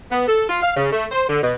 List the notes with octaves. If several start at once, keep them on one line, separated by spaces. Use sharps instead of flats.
B3
A4
F4
F5
C#3
A3
C5
D3
B2